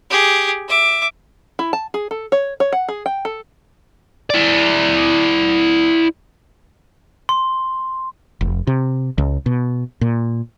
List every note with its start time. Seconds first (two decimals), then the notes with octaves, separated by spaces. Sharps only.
0.10 G4 G#4
0.68 E5 D6
1.59 E4
1.73 A5
1.94 G#4
2.11 A4
2.32 C#5
2.60 C#5
2.72 F#5
2.88 G#4
3.06 G5
3.25 A4
4.30 E4 D5
7.29 C6
8.41 F1
8.67 C3
9.18 C#2
9.46 B2
10.01 A#2